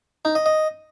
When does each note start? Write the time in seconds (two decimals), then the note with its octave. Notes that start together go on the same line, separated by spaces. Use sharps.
0.25 D#4
0.35 D#5
0.46 D#5